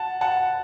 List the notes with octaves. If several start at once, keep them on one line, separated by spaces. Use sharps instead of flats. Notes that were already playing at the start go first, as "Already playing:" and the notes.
Already playing: F#5 A5
F#5 A5